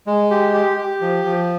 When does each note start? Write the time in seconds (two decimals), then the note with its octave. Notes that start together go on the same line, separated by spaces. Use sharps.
0.07 G#3
0.31 G4
0.53 G4
0.77 G4
1.01 F3
1.25 F3